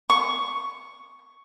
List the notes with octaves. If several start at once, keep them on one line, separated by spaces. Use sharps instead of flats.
C#6